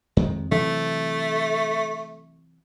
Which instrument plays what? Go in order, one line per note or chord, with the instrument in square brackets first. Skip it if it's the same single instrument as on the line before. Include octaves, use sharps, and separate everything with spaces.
[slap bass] F2 D#3 G#3
[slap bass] C3 E3 F#3 [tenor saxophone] A3